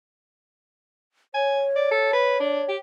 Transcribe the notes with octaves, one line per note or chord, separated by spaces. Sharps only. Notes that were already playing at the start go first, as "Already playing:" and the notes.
C#5 G#5
D5
A4
B4
D4
G4